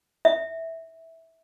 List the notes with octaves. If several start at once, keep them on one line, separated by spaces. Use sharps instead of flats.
E5